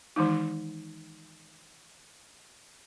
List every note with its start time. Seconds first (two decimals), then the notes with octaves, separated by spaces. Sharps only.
0.16 D#3 E3 G#3 D#4